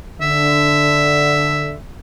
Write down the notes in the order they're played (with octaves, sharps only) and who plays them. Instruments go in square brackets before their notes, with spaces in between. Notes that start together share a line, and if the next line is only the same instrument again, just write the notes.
[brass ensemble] D3 [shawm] E5